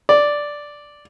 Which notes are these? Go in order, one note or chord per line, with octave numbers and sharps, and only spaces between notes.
D5